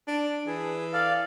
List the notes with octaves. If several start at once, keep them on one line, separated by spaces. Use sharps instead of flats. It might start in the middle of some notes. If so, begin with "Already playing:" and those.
D4
E3 G#4
A4 D5 F5